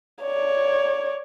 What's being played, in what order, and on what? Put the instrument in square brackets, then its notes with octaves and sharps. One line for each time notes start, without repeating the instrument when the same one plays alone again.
[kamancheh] C#5 D5